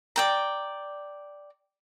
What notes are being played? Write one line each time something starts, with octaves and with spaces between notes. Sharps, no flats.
D5 G5 A#5